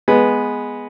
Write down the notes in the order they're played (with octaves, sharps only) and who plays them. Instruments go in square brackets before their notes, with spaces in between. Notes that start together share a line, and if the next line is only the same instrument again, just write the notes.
[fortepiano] G#3 B3